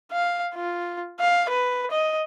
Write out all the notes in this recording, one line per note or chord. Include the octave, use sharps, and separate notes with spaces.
F5
F4
F5
B4
D#5